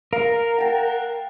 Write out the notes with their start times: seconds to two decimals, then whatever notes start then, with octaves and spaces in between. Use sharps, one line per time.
0.13 A#4 F5
0.58 F#5 G5 A5